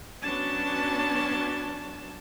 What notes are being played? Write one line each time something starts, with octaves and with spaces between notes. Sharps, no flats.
F#3 B3 C#4 D4 A5